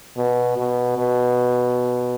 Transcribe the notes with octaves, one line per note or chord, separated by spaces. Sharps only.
B2
B2
B2